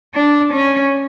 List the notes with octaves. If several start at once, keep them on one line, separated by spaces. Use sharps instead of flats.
D4
C#4